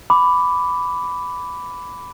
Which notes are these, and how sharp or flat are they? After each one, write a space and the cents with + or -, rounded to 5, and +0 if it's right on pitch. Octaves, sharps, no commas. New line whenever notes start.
B5 +10 D6 -10